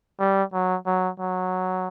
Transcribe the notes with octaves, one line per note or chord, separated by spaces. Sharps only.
G3
F#3
F#3
F#3